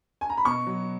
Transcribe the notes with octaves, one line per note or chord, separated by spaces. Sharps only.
G#5
A#5
B5
B2 C#6
F#3